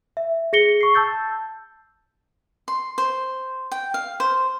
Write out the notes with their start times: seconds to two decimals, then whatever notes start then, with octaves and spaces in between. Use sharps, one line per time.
0.17 E5
0.53 G#4 A#6 C#7 G7
0.81 C#6 C7
0.94 A5 E6 G6 A6
2.68 C6
2.98 C5
3.72 G5
3.94 F5
4.20 C5